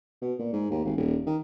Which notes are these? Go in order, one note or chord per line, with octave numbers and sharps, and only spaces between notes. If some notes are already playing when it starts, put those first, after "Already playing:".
B2
A#2
G#2
D#2
G#1
D#1
D#3